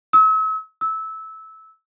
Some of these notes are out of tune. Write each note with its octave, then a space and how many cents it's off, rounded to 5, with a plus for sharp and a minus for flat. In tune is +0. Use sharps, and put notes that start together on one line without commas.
E6 -40
E6 -20